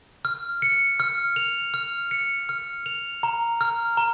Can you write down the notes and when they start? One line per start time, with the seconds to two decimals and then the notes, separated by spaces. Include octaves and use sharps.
0.25 F6
0.62 C#7
1.00 F6
1.36 F7
1.74 F6
2.11 C#7
2.49 F6
2.86 F7
3.23 A#5
3.61 F6
3.97 A#5